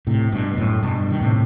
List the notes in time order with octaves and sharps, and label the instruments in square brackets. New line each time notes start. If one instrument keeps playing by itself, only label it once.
[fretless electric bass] A2 C3
G2 B2
B2
F#2 A2
G2 B2
D#3
A2 C3